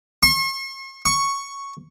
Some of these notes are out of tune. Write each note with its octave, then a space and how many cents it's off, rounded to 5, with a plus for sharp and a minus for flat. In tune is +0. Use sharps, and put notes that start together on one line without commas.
C#6 -45
C#6 +0